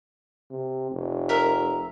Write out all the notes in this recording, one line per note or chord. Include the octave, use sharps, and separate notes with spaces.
C3
F1
A#4 E5